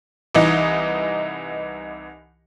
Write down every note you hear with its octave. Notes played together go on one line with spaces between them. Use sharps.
C2 E3 D#4 D#5